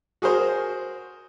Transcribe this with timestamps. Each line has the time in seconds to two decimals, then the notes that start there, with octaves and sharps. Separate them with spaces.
0.22 F#4 G#4 A#4 C5